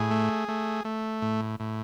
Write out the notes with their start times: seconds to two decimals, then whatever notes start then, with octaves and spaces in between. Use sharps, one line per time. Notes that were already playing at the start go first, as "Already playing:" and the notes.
Already playing: A2 G#4
0.11 A3
0.48 A3
0.85 A3
1.22 A2
1.60 A2